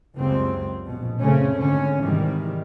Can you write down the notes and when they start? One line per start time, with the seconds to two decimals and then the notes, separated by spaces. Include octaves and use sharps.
0.16 F#1 C#2 F#3 G3 C4
0.86 A#1 B2
1.20 F#1 C#3 A3 C4 C#4
1.56 G#1 D3 C#4
2.03 G#2 C3 D#3 E3 G3